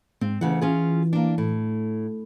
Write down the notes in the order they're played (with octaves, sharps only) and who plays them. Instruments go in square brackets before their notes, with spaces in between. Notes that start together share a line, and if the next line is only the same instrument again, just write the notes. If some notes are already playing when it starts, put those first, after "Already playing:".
[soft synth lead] G#2 [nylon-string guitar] C4
[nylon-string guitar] D2 C#3 F#5 [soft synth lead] E3
[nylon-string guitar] C#4 F4 G#4
A#3 D4
A2